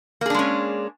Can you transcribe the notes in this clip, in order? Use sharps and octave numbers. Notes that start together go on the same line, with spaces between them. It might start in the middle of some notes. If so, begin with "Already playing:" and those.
G#3 A#3 C#4 D4 G#4